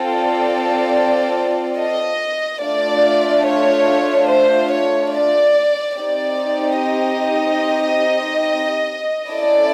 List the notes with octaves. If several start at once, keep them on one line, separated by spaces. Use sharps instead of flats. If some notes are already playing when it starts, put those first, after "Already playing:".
Already playing: C4 F4 A4
D5
D#5
A3 D4 F4 D5
C#5
C5
C#5
D5
C4 D#4 G4 D5
D#5
C#4 E4 A4 D5